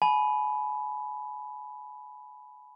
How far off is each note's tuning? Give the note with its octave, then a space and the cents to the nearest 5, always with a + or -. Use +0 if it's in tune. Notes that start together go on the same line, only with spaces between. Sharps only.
G#5 +35 B5 +0